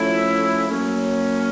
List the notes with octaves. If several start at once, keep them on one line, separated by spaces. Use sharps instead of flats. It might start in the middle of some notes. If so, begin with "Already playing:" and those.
Already playing: F3 A3 C#4 E4
F#3 A#3 C#4